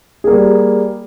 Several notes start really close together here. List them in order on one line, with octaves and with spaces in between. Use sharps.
G#4 A#3 G3